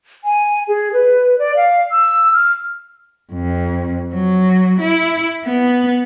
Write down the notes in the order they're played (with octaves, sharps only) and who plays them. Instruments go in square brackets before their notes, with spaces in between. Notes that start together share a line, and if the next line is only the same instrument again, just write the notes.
[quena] G#5
G#4
B4
D5
F5
E6
F6
[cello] F2
F#3
E4
B3